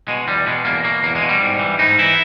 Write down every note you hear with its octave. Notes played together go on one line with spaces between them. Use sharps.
B2 G#3
E2 G3
B2 G#3
E2 A#3
B2 A#3
E2 A#3
G#3
B2
G3
G#2
E3
G#2 D#4
E3 E4